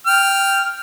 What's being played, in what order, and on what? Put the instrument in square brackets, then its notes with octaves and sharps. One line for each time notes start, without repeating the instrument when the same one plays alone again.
[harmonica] G5 F6